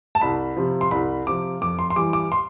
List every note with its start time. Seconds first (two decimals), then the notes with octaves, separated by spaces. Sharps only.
0.15 A5
0.21 C2 B5
0.56 C3 F3
0.81 C6
0.91 C2 B5
1.26 C3 F3 D6
1.61 F2 D6
1.79 C6
1.90 C6
1.96 E3 G3 D6
2.13 D6
2.32 C6